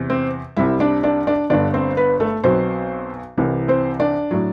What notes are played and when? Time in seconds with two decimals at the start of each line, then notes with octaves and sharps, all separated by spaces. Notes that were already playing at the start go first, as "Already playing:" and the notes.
Already playing: E2 C3
0.10 C4 C5
0.56 C2 C3 G3 E4 E5
0.80 D4 D5
1.03 D4 D5
1.27 D4 D5
1.50 G1 G2 D3 D4 D5
1.74 C4 C5
1.97 B3 B4
2.20 A3 A4
2.44 B1 B2 F#3 C4 C5
3.37 C2 C3 E3
3.68 C4 C5
4.00 D4 D5
4.31 A2 F#3